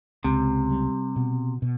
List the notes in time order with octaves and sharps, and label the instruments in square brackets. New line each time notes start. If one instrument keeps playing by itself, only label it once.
[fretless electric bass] C#2 [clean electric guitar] C3
[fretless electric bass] G3
B2
B2